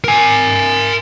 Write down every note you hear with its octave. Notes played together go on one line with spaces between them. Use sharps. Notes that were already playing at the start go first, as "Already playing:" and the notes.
A#4 G#5